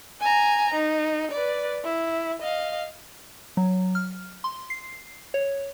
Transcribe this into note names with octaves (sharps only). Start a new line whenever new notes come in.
G#5 A#5
D#4
B4 D5
E4
D#5 F5
F#3
F6
C6
C7
C#5